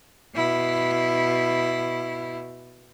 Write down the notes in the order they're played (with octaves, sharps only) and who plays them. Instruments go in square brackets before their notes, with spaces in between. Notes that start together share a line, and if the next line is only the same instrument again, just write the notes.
[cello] B2 E4